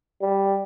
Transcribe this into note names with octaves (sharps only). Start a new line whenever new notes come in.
G3